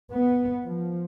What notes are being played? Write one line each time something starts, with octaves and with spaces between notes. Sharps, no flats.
B3
F3